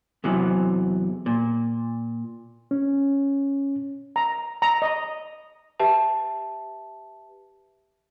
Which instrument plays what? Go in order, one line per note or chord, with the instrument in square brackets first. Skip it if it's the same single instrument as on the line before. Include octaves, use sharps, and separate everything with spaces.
[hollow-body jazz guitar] E2 C3 E3 F#3
A#2
[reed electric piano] C#4
[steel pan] A#5
A#5
D#5
[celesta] G4 B4 E5 A5